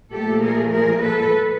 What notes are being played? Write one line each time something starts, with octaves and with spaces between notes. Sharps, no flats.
A#2 F3 A3 G4 A4
G#4 A#4
G#4 A#4
A4 B4